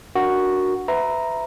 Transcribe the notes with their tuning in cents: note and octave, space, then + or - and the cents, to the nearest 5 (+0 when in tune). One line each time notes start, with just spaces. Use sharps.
D4 +0 F#4 +0 A#4 +0
B4 +25 E5 +0 A#5 +0